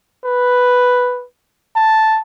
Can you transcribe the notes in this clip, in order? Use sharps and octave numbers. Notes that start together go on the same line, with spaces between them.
B4
A5